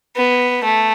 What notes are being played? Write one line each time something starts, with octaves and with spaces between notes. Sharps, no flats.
B3
A3